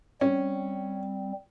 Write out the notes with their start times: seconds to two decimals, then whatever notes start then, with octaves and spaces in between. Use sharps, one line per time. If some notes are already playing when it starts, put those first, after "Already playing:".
0.21 G3 C4 C#4